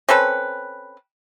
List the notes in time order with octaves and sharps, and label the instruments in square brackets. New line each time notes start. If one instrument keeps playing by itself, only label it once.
[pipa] C4 C#4 A4 B4